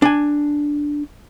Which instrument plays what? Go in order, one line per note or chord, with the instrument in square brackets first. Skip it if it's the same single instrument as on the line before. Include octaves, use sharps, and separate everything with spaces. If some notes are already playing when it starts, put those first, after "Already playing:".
[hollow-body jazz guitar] D4 G#5